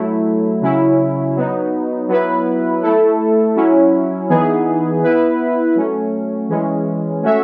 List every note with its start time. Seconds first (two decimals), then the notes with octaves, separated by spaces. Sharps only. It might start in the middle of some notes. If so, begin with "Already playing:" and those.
Already playing: F#3 A3 E4
0.61 C#3 F#3 C#4 E4
1.36 F#3 B3 D#4
2.08 F#3 B3 E4 B4
2.82 A3 E4 A4
3.56 F#3 C#4 E4
4.29 E3 B3 D#4 G#4
5.03 B3 E4 B4
5.75 F#3 A3 C#4
6.49 E3 G#3 C#4
7.22 A3 C#4 F#4 C#5 E5